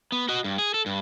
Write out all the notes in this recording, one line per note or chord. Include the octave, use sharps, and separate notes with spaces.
B3
F#4 D#5
G2
G#4
A4
G2